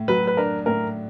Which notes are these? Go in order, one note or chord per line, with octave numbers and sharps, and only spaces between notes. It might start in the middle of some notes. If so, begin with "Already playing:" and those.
Already playing: A2
F#3 B4
B4
D4 A#4
A2 A#4